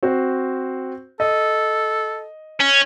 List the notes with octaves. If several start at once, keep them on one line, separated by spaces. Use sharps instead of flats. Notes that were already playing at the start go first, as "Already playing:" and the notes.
C4 F#4 C5
A4 D#5
C#4